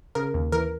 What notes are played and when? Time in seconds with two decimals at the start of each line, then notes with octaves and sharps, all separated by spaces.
0.15 C#3 A#4
0.34 D#2
0.52 E3 A#4